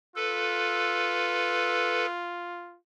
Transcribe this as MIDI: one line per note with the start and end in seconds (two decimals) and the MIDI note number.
0.16 2.78 65
0.16 2.06 69
0.16 2.06 71